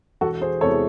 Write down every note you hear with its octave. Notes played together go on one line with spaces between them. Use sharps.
E1 F#4 A4
G#4 C5
E2 C3 E3 G#3 A4 C#5